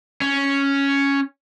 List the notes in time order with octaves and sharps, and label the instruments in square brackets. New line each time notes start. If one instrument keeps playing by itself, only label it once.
[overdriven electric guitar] C#4